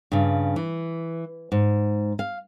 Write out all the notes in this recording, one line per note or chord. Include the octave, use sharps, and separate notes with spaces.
G2 C#3
E3
G#2
F5